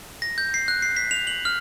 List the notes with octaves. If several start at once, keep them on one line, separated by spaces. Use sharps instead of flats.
A#6
G6
C7
F#6
C7
B6
F7
F#7
F6